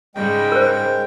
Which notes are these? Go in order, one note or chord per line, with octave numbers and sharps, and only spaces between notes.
G#2 C#3 G3 G#3 G5
A#4 C5